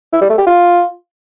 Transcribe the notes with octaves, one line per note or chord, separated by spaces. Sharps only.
E4
G3
A3
G4
F4